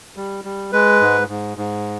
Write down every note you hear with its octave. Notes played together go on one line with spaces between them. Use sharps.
G3
G3
G#3 B4
G#2
G#2
G#2